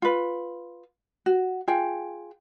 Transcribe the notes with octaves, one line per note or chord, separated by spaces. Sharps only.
F4 B4
F#4
F4 G#4 G5